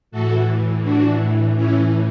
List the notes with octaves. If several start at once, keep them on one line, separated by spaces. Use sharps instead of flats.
A2 E3 F#4 A4
D4 F#4
A2 E3 C#4 E4